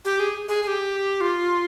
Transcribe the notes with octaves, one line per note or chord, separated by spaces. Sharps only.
G4
G#4
G#4
G#4
G4
F4